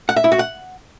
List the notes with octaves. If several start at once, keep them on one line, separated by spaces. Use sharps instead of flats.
F#5
E5
E4
F#4
F#5